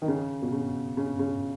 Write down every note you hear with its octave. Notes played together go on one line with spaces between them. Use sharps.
D#3
C#3
B2
C#3
C#3
C#3